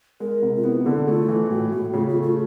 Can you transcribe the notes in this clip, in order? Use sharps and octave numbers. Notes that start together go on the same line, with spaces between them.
G#3 A#4
C3
F4
B3 E4
D3 E4
A3 F4
E3
A2 F#4
A2 F#4
C#3 F4
F4
A3
F4